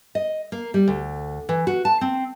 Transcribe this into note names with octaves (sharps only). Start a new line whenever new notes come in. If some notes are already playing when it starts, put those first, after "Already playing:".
D#5
A#3
G3
D2
E3
F#4
A5
C4